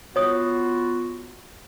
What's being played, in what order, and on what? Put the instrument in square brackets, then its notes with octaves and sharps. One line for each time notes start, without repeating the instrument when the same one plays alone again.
[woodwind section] B3 F4 [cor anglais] F#4 [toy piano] C#5 D#6